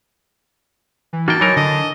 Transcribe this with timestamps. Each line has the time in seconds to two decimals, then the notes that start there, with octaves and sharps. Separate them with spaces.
1.13 E3
1.28 A#3 D#4 F#4 G5 A5
1.41 E3 F#3 D#4 A#4 C#5
1.56 D3 D#5 A5